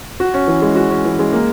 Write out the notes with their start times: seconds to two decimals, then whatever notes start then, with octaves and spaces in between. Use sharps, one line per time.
0.20 F#4
0.34 C#4
0.48 E3
0.62 G#3
0.76 F#4
0.90 C#4
1.05 E3
1.19 G#3
1.33 A#3